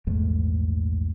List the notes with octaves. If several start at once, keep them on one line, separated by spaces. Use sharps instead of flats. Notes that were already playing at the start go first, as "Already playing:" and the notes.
A#1 E2 G#2 A3